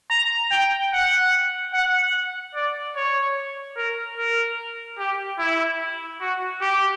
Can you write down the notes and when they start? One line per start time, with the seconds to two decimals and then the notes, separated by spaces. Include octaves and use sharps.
0.10 A#5
0.51 G5
0.93 F#5
1.73 F#5
2.55 D5
2.96 C#5
3.77 A#4
4.17 A#4
4.98 G4
5.39 E4
6.21 F#4
6.61 G4